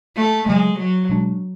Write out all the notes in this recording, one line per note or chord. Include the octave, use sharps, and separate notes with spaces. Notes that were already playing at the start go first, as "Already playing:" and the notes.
A3
C#3 F#3 G#3 A3
F#3
B2 G#3 D4